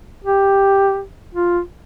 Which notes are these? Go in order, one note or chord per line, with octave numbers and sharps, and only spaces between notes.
G4
F4